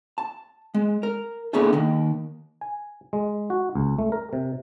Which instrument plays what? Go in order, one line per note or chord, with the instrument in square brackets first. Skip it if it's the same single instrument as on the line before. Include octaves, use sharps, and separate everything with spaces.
[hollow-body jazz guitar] A5
G#3
A#4
A#3 B3 D4 E4 G#4 A4
D#2 D#3
[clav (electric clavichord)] G#5
G#3
F#4
C#2
A3
A#4
C3